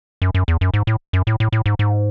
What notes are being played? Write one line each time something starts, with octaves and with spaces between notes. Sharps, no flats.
F#2
F#2
E2
F#2
G#2
A2
F#2
A2
A2
A2
G#2
G#2